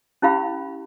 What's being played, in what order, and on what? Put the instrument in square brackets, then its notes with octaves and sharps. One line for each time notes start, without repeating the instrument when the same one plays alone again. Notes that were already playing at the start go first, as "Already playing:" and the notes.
[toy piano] C#4 E4 G4 F5 B5